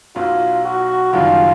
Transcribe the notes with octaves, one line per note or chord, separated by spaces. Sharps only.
B1 B2 F#3 F4
F#4
F#1 F#2 D#3 G3 F4